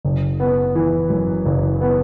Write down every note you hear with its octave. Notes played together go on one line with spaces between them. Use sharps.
F#1
B3
E3
F#2
F#1
B3